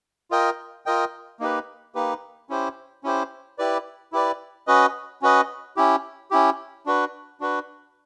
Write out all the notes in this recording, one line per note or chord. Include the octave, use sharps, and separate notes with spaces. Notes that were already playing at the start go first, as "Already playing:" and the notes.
F4 A#4 D#5 G5
F4 A#4 D#5 G5
A#3 D#4 G4 B4
A#3 D#4 G4 B4
C#4 E4 G4 C5
C#4 E4 G4 C5
E4 G4 B4 D5
E4 G4 B4 D5
C#4 F#4 B4 D#5
C#4 F#4 B4 D#5
C#4 E4 G4
C#4 E4 G4
D4 F#4 B4
D4 F#4 B4